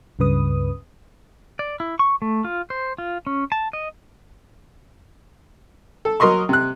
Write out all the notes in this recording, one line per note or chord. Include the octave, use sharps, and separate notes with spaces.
C#2 G2 C#3 B4 D#6
D5
E4
C#6
A3
F4
C5
F4
C#4
A5
D#5
A4
F#3 A#4 D#5 C6 C#6
C3 F#6